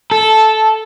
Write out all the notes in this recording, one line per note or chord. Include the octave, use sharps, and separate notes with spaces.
A4